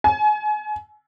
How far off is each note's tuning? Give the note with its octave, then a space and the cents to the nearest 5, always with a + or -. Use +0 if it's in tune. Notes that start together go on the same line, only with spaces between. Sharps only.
G#5 +35